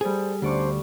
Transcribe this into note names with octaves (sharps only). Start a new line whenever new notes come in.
G3 G#4 A4 C5 D5
D2 G2 C#4 D4 C5 D5 C#6